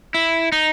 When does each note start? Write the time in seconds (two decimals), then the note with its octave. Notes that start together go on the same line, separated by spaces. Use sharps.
0.14 E4
0.52 D#4